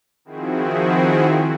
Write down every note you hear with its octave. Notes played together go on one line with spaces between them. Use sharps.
D#3 F3 C4 E4 F#4 G#4